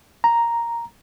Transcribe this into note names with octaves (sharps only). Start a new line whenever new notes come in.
A#5